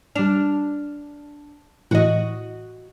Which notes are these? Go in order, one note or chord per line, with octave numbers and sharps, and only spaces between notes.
G3 D4 F6
A2 E3 F#4 D#5